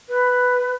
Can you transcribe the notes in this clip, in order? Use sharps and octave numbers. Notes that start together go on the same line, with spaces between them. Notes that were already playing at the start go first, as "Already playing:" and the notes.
B4